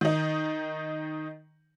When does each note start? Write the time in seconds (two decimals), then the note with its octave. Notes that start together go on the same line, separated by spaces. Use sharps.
0.01 D#3 D#4